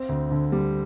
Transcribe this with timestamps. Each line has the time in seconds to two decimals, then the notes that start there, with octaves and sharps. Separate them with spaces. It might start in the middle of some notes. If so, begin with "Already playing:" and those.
Already playing: C4
0.09 D2
0.31 D3
0.52 G3